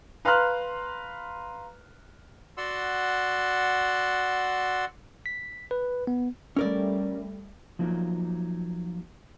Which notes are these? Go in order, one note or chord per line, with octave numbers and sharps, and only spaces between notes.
B4 F5 A#5 C6 F6 F#6
F#4 D5 F#5 C6 E6
B6
B4
B3
G3 A3 C#4 A#4 D5
F3 F#3 A#3 D#4